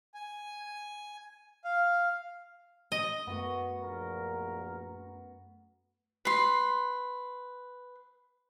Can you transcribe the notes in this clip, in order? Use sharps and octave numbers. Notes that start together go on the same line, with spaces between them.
G#5
F5
D#5
F#2 A3 B3 F#4
A#1 A#4
B4 C6